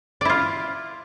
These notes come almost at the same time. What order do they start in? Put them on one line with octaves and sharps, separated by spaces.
D5 E4 F4